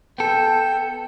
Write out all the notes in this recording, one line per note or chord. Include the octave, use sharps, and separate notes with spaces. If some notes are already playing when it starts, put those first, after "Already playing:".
B3 A4 G5